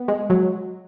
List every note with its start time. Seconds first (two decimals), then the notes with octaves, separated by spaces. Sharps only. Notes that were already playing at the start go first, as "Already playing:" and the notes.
Already playing: B3
0.08 G#3
0.30 F#3